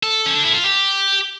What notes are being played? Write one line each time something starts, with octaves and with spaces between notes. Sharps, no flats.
A4
C#4
D4
E4
F4
G4